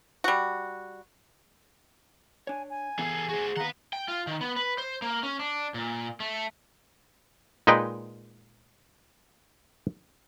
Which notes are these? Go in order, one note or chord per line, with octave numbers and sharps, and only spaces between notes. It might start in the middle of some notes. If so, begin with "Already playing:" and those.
G3 F#4
D4 C#5 G#5
G#5
E3 B3 G#4 A4
F#4 G#4 C5
D#3 B4 F5 F#5 A#5
G5
F4
D#3
B3
B4
C5
A#3
C#4
D4
A#2
A3
A#2 G#3 D#4 B4 D#5 G5